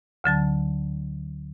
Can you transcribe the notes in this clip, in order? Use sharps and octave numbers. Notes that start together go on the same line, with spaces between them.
D2 D3 F#3 A5